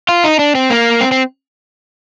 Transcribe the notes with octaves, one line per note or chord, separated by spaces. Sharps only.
F4
D#4
D4
C4
A#3
C4
C4